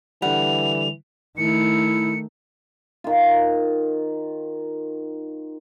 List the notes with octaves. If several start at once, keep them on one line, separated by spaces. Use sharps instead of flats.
D3 E3 G3 F#5 F7
D#3 A3 E4 C#7
D#3 F4